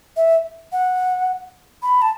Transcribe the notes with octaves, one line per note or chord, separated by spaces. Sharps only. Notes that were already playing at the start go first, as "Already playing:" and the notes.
E5
F#5
B5
A5